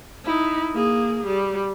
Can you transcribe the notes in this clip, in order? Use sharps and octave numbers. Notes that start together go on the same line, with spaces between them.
D#4 E4
A#3 G#4
G3